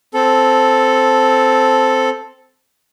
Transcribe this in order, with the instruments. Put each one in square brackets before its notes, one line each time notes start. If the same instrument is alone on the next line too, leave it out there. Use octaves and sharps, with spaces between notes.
[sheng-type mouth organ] C4 A4